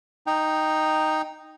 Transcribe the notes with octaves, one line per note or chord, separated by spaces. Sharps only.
D#4 G5